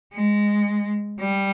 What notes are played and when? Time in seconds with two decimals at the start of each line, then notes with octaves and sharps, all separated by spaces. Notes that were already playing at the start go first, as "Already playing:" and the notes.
0.13 G#3
1.20 G3